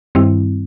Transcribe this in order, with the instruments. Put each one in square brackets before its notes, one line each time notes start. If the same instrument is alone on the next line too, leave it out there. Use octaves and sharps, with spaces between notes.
[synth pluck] G2 D#3 G3 C4 E4